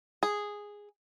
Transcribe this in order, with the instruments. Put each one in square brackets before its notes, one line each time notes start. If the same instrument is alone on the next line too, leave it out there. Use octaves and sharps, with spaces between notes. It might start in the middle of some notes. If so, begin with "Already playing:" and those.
[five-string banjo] G#4